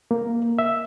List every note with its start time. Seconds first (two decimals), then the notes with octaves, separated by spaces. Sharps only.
0.11 A#3
0.59 E5